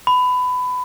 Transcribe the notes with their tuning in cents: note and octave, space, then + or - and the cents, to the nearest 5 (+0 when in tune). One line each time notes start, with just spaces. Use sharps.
B5 +20